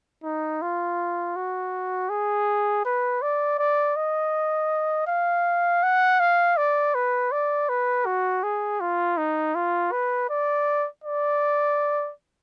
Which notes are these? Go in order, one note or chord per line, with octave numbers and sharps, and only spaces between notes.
D#4
F4
F#4
G#4
B4
D5
D5
D#5
F5
F#5
F5
D5
B4
D5
B4
F#4
G#4
F4
D#4
F4
B4
D5
D5